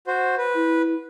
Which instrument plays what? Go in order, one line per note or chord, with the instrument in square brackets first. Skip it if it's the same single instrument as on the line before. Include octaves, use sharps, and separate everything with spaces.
[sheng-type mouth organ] F#4 C5
B4
[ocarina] E4